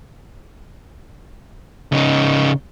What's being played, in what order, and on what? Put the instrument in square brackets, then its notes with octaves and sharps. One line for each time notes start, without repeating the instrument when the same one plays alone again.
[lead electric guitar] C#3 D#4